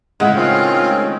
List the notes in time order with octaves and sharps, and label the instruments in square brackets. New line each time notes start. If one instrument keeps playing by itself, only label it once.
[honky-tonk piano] A2 C#3 G#3 [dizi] E5 [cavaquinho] F#5
[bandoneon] D#3 C4 C#4 [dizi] F4